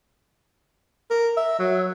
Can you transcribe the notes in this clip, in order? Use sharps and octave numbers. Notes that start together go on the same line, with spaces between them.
A#4
E5
F#3